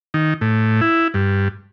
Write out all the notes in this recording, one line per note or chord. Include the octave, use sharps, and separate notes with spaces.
D#3
A2
E4
G2